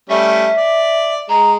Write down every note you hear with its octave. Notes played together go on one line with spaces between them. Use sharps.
G3 A3 C#4 E5
D5
G#3 A#5